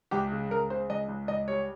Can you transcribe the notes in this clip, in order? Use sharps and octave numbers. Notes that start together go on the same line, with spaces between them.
C#2 G4
C#3
C#2 A#4
C#3 C5
C#2 D#5
C#2
C#2 D#5
G3 C#5